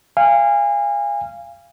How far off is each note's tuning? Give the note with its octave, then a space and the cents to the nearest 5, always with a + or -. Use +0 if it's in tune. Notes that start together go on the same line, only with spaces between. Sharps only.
F5 -20 G#5 -30